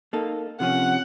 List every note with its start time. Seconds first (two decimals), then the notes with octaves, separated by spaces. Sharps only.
0.13 A#3 D#4 A4
0.60 C3 F3 C#4 F#5